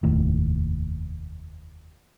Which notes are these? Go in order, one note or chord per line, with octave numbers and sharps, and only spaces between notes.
F1 D#2 A2